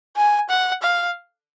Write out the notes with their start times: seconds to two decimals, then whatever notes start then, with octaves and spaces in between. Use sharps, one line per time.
0.16 G#5
0.49 F#5
0.82 F5